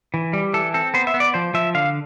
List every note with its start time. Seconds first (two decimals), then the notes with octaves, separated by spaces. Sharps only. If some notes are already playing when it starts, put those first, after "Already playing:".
0.14 E3
0.33 G3
0.54 E3 A4
0.74 C4 A4
0.94 B3 C5
1.07 E5
1.14 B3
1.20 D5
1.34 F3 C5
1.54 F3 E5
1.74 D3 F5